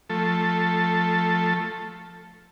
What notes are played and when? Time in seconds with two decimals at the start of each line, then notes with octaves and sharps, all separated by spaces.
0.10 F3 A3 A4